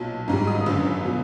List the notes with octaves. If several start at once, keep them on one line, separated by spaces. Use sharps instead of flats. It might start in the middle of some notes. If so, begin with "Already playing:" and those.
Already playing: B1 A#2 F#3 A5
G#1 G#2 D#3 G3 A#5
D#6
G1 F#2 D3 E6
B2 F#3